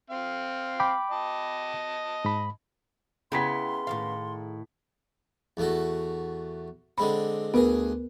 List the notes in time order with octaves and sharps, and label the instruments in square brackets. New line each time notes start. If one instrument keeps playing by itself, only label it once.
[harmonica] C4 F5
[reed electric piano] G5 B5 D6
[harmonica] D#5 A5
[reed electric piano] G#2 B5
[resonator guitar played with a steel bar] C#3 B3 [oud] E4 G4 [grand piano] G#4 A#5 B6 [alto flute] C6
[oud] A2 D#3 F5
[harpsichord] E2 A3 F#4
[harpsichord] D3 G#3 C4 [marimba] B5
[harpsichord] D2 G#4 [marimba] B3 A#4 B4